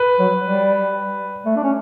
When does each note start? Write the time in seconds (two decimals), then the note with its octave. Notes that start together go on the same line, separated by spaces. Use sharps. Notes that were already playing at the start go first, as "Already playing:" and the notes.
Already playing: B4
0.19 F#3
0.43 G3
1.45 A3
1.56 D4
1.63 C#4